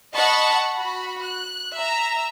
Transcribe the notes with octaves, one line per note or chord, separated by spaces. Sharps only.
D#5 F#5 A5 B5 C#6
F#4 B5
F#6
E5 A#5